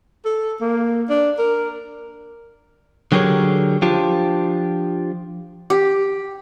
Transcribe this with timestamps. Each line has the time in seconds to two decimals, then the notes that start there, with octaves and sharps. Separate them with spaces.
0.25 A4
0.61 A#3
1.09 D4
1.38 A#4
3.12 D3 F#3 G4 G#4 A#4 C#5
3.82 F3 D4 F4 G4
5.70 G4